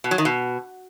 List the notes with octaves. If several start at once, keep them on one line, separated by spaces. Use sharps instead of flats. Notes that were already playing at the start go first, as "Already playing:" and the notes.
B2
F#3
D#3
B2